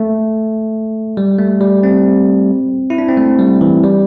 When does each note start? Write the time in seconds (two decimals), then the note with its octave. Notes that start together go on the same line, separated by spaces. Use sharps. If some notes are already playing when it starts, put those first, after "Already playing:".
Already playing: A3
1.17 G3
1.38 A3
1.61 G3
1.83 C4
2.90 E4
2.98 D4
3.08 C4
3.17 A3
3.39 G3
3.61 E3
3.84 G3